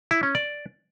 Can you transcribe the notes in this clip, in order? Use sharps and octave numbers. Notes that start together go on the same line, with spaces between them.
E4
C#4
D5